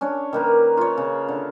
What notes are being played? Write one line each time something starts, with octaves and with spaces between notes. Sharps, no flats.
C#4 D4 C#5
D#3 A#3 B4
F4 C#5
C#3
D3